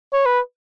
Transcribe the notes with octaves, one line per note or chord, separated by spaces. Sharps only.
C#5
B4